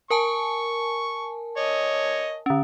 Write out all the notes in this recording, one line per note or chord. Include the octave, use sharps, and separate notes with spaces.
A#4 G#5 A5 C#6
C#5 D#5
D3 C#4